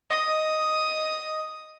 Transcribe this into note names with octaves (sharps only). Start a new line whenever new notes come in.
D#5 D#6